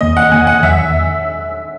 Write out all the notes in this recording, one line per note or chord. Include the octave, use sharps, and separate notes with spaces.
E2 D#3 A#3 D#5
F#5
E2 D#3 A#3 G#5
F#5
E2 D#3 F#3 E5
E5